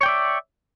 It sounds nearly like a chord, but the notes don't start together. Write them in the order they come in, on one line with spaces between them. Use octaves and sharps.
C#5 G5 D5 E5